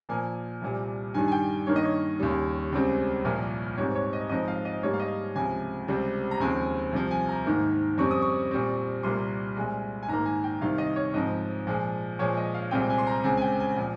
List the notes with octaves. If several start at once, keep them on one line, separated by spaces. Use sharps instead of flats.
A#2 F3 A#3 G#5
C2 A#2 G3
G2 D#3 G3 G#5
G#5
G5
G2 D#3 A#3 C#5
D#5
C#5
D#2 C#3 G3
C#2 C#3 G3 C4
C2 A#2 F3 A#3
G#2 G3 C4 C#5
C#5
D#5
G#2 F3 C4 D#5
F5
D#5
G#2 G3 A#3 C#5
F5
D#5
C#2 C3 F3 G#5
C#2 C3 G3 C4
A#5
D#2 C#3 F3 G#3 C4 G#5
C2 C3 F3
G#5
A#5
G#2 D#3 A#3
F2 C#3 G3 C4 C#6
D#6
C#6
A#2 G3 C4
C2 A#2 G3 A#3 C6
C2 A#2 G#3
G#5
G#2 D#3 A#3 A#5
G#5
G5
C2 C3 D#3 F5
D#5
C#5
G#2 F3 C4 D#5
A#2 F3 G#3
A#2 F3 G#3 C#5
D#5
F5
C2 A#2 G#3 C4 G5
G#5
C6
A#5
C#2 C#3 G#3 C4 G#5
G#5
G5
G#5
A#2 F3